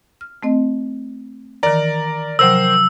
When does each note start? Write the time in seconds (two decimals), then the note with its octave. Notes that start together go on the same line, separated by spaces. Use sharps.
0.21 F6
0.43 A3 C4 D#5
1.63 D#3 E3 A#4 D5 A#5
2.39 C3 F3 F#3 A#4 C5 G5 E6